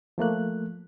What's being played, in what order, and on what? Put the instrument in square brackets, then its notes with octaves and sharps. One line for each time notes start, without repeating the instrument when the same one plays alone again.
[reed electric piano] F3 A3 A#3 F#6